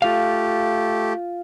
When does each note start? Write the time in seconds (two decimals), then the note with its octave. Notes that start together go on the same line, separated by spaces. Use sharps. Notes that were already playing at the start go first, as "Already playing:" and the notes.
0.02 A3 F4 G4 F5